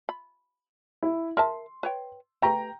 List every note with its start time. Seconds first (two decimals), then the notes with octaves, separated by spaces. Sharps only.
0.09 B5
1.03 E4
1.37 A#4 E5 A5 C6
1.83 B4 C#5 G5
2.42 A3 G4 B4 G5 A#5